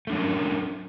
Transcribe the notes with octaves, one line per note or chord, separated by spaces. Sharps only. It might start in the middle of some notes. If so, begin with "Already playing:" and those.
F#3 A3 C#4 D4 A#4